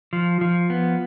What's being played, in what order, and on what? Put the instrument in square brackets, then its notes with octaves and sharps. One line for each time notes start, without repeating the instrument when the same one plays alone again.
[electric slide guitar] F3
F3
B3